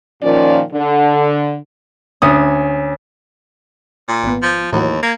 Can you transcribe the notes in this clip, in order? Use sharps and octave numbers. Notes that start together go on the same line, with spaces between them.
A#2 D#3 F3 C#4 D5
D3
D2 C#4 D#6
A#2
G#1 B3
F3
D#2 A2 E3 F#3
A#3 G#6